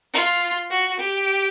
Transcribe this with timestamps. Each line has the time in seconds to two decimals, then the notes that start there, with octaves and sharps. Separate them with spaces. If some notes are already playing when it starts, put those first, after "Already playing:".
0.13 F4
0.70 F#4
0.99 G4